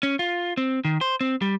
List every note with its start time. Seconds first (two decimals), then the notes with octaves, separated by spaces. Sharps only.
0.03 C#4
0.19 F4
0.57 C4
0.85 D#3
1.01 C5
1.21 C4
1.42 G3